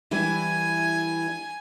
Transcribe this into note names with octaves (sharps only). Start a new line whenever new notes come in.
E3 G3 E4 G#5